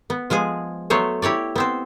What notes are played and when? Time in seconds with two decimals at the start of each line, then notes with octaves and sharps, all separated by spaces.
0.10 B3
0.30 F3 G#3 B3 G#4
0.90 F#3 A3 B3 C5 C#5
1.22 E4 G4 C#5 D5
1.56 B3 C4 C5